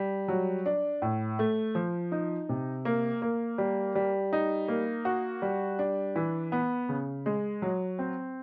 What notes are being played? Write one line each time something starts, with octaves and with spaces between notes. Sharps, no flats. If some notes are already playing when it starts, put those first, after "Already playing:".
Already playing: G3
F#3
D4
A2
A3
F3
D#4
C3
A#3
A#3
G3
G3
D#4
A#3
F#4
G3
D4
E3
B3
C#3
G#3
F#3
C4